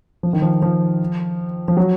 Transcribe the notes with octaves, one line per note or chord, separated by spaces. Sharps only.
F3
D#3
F3
F3
F3
F#3